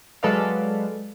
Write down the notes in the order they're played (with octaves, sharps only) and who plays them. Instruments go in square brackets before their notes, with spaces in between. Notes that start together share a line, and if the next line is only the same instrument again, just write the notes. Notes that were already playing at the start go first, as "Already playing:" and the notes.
[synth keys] F#3 G#3 A4 B4 D5 F5